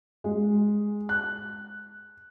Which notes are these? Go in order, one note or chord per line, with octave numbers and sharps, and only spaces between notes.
G#3
F#6